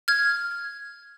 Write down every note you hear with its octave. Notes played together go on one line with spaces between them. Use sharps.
F6 G#6